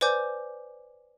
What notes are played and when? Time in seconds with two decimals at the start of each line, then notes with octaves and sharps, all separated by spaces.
0.01 B4 C5 D5 G#5 D6 G6